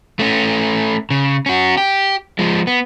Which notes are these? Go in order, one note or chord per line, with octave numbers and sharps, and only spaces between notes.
A3 C#4
C#3
C#4 F#4
G4
F3 G#3
B3